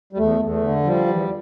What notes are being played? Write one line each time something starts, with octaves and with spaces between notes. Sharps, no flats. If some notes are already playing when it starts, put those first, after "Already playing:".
G3
E2 A3
E2
A3
D3
F3 G3
E2